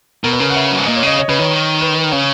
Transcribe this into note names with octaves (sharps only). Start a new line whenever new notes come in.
B2 A#4
B4
C#3 A#4
F#5
E5
F#2
G#2
A#2 D#5
C#5
C#3 D#5
C#5
C#3 B4
D#3 C#5
B4
C#3 C#5